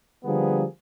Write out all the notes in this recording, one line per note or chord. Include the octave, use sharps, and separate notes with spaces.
D3 F3 G3 A#3 B3 G#4